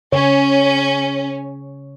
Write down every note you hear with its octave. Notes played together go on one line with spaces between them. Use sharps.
C#3 C#4 C#5